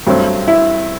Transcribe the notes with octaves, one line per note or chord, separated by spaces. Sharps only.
G2 F#3 A3 C4
E4